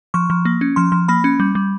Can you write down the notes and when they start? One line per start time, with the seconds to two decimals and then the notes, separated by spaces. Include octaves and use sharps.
0.14 F3 C#6
0.30 F3
0.45 A#3
0.61 C#4
0.76 F3 C6
0.92 F3
1.08 A#3 B5
1.24 C#4
1.40 G3
1.55 G3